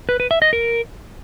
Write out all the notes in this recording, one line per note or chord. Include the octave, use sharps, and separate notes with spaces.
B4
B4
E5
D#5
A#4